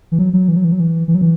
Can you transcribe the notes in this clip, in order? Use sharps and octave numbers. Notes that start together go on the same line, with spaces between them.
E3
F#3
F#3
E3
F#3
E3
F#3
E3
E3
F#3
E3